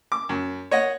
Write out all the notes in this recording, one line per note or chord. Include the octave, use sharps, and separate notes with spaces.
D6
F#2
C#5 D#5 F#5